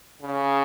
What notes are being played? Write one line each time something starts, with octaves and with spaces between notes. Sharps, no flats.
C#3